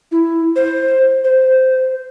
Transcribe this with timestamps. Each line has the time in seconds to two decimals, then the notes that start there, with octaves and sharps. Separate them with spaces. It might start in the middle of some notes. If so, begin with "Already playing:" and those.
0.12 E4
0.56 C5
1.24 C5